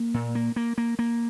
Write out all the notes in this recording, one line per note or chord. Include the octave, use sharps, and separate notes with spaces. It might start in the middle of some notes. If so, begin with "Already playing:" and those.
Already playing: A#3
A#2
A#3
A#3
A#3
A#3